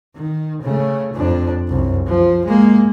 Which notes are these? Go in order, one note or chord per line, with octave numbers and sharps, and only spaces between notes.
D#3
C#3 A3
F2 D4
C2 F#2
F3
G#3 A#3